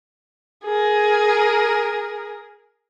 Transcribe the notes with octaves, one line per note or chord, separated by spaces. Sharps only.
G#4 A#4